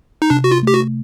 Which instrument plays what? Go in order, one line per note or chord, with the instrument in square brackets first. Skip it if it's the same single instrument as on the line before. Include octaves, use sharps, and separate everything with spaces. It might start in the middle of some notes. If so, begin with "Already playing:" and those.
[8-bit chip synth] D#4
[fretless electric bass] C3 [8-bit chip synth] D4
[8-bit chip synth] F#4
F4
[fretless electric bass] A3 [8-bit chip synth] G4
[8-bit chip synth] F#4